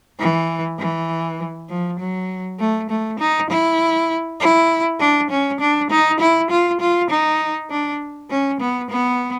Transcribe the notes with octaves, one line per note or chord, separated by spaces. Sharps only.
E3
E3
F3
F#3
A3
A3
D#4
E4
E4
D4
C#4
D4
D#4
E4
F4
F4
D#4
D4
C#4
B3
B3